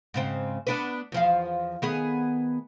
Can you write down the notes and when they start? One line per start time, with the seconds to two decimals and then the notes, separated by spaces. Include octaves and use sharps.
0.14 G#2 C#3 C4
0.67 B3 D4 B4
1.12 E2 F3 F5
1.82 D#3 B3 G#4